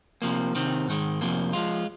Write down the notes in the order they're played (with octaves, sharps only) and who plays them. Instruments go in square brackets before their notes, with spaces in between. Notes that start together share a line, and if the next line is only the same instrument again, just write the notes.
[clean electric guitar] C3 F3 A#3
C3 D#3 C4
G#2 D#3 G#3
F2 C3 F3 A#3
F3 G#3 F4